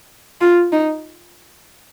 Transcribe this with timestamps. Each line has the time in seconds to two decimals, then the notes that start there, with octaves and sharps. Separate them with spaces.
0.41 F4
0.72 D#4